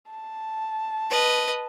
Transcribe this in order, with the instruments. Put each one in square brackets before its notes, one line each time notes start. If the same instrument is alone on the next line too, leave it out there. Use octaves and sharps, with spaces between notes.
[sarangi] A5
[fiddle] B4 D#5